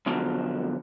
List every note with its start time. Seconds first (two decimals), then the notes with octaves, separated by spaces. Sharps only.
0.06 F2 B2 D3 F3 F#3